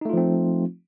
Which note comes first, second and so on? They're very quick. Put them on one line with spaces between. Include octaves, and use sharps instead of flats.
D#4 A3 F4 F3 C4